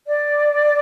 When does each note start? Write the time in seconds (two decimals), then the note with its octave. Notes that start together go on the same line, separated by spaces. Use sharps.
0.07 D5